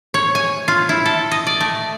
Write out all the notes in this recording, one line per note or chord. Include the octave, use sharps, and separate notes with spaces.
C#5
G#5
F4
E4
A4
D#5
D5
A3